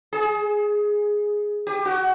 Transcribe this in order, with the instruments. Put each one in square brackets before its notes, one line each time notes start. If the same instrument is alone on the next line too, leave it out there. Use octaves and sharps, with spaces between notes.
[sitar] G#4
G4
F#4